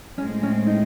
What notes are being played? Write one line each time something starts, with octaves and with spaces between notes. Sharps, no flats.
A2 G#3 C4 C#4
C#4
D#4